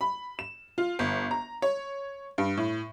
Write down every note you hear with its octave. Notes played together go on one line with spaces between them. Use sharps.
B5
E7
F4
G1
A#5
C#5
G2
A2